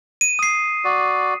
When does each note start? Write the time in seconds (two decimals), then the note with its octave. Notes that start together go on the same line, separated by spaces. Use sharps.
0.21 D#7
0.39 D#6 C7
0.84 F#4 D5